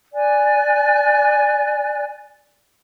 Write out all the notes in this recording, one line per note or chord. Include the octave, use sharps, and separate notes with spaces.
D5 G#5 F#6